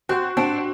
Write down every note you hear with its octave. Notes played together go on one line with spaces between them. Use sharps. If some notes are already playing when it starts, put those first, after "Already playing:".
C4 F#4
C4 D4